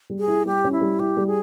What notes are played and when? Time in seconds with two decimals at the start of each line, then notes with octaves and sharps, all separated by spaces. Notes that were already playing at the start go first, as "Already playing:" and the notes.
0.10 G3
0.19 G#4
0.28 E4
0.46 G3 G4
0.64 C#4
0.72 E4
0.81 G3
0.99 E4 G4
1.17 G3
1.27 G#4